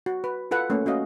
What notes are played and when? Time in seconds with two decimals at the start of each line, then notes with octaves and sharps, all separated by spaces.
0.06 F#4
0.24 B4
0.51 F4 A4 B4 F#5
0.70 A3 A#3 C#4
0.86 C#4 F#4 D#5 F5